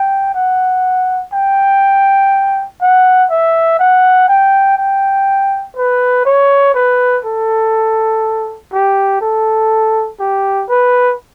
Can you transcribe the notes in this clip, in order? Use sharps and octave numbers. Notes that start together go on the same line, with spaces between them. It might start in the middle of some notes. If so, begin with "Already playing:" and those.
Already playing: G5
F#5
G5
F#5
E5
F#5
G5
G5
B4
C#5
B4
A4
G4
A4
G4
B4